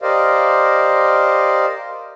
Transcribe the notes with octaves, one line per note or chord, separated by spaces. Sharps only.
G4 A#4 C5 D5 D#5 F5